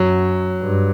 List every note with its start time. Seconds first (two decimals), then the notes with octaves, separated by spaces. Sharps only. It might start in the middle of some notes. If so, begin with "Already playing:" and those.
Already playing: F#2 F#3
0.62 G2